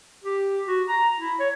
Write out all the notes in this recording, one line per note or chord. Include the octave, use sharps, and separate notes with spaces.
G4
F#4
A#5
E4
C#5